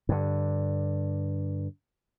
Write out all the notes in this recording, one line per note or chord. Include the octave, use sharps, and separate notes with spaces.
G2 D3